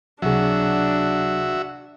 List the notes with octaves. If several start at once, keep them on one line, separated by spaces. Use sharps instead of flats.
C#2 C3 F#3 D4 F#4 G#4 E5